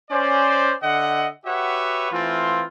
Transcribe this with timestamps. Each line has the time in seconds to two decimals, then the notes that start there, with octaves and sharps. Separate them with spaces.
0.10 C#4 C5 D5
0.82 D3 D#5 E5 F#5
1.45 F#4 G4 B4 C#5 E5 F#5
2.11 E3 A3 C4 F4